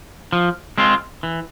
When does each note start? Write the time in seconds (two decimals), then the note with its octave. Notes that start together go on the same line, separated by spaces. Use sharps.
0.32 F3
0.78 G#3 C4 F4
1.23 E3